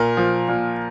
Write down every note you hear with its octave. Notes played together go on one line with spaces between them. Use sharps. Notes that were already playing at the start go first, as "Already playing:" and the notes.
Already playing: A#2 A#4
F3
A#2